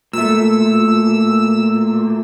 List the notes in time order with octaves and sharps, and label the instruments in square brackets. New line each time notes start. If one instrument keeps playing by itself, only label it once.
[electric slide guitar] A#2 A3 [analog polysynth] E6